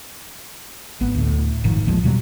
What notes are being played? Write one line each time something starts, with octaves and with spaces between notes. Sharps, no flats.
G#1 B3
D2 A2
F1 G#2 D#3 F3
A1 D#2 F3 G#3
E2 B2 F#3 G3